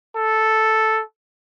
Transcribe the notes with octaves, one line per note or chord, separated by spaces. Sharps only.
A4